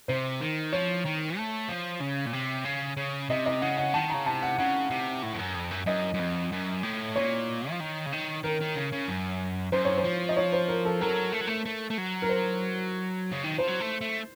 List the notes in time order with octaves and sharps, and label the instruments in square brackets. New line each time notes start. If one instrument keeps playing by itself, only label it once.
[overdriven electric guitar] C3 [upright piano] C5
[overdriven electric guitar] D#3
[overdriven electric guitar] F3 [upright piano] C#5
[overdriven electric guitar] D#3
A3
F3
C#3
A#2
C3
C#3
C#3
[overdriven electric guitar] C3 [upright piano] D#5
[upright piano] D#5
[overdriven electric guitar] C#3 [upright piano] F#5
[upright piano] F#5
[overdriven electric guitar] D#3 [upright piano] A5
[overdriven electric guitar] C#3 [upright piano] A#5
[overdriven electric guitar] C3 [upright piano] A5
[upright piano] F#5
[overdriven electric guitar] C#3 [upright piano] F#5
[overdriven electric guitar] C3
A2
F2
F#2
F2
F#2
[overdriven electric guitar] F#2 [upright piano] D#5
[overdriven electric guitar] F#2
F2
F#2
A2
[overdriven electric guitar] A#2 [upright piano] C#5
[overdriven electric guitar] F3
D#3
C#3
D#3
[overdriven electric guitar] D#3 [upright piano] A#4
[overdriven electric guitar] D#3
C#3
C#3
F#2
[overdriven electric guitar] F#2 [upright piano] C5
[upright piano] C#5
C5
[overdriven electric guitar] F3
[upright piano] D#5
C#5
C5
A#4
A4
[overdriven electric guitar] F#3 [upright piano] A#4
[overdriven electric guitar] A3
F#3
A3
A3
A3
F#3
[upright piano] A#4
C5
[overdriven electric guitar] C#3
D#3
[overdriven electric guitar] F3 [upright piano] C5
[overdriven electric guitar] F#3
A3
A3